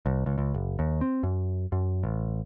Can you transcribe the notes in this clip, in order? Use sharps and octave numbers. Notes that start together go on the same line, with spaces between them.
C2
C#2
C#2
F#1
D#2
C4
F#2
F#2
A1